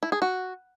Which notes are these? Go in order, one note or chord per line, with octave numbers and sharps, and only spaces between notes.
E4
G#4
F#4